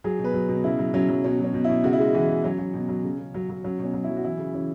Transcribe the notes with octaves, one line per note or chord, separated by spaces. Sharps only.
F#3 G#4
B2
B4
F#3
B2
C#3 E4
F#3
F#3 C#4
F#3
B2 C#4
F#3
C#4
B2
B2 E4
C#3 F#4
E4
G#3 F#4
E3 F#4
C#3
F#3 C#4
F#3
B2
F#3
C#3
C#3
F#3
F#3
F#3 C#4
B2
C#4
F#3
E4
F#3
F#4
E3 E4
C#3
E3 C#4